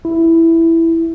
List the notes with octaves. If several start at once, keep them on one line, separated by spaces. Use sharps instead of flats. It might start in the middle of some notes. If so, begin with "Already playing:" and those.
E4